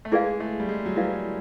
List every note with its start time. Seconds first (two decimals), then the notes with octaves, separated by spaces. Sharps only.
0.05 A3
0.11 G#3 E4 G#4 B4 D5 F5
0.40 A3
0.60 G3
0.69 G#3
0.86 F#3
0.96 G3 E4 G#4 B4 D5 F5